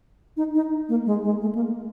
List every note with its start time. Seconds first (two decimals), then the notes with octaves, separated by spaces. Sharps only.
0.37 D#4
0.55 D#4
0.89 A#3
1.06 G#3
1.24 G#3
1.41 A3
1.55 A#3